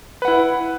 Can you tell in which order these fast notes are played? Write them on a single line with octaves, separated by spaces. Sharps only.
B4 F#5 E4